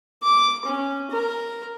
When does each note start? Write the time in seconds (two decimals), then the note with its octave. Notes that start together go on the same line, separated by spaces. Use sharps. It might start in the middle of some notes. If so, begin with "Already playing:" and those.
0.23 D6
0.65 C#4
1.11 A#4